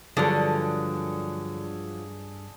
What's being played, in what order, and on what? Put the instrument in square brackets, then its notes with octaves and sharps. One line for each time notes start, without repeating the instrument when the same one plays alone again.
[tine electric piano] G2 [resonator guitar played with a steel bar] D3 [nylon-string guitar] F3 F#3 [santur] G#4 A4 D5